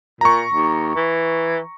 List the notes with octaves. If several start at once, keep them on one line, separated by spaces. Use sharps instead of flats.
A#2 A#5 C#6
D#2
E3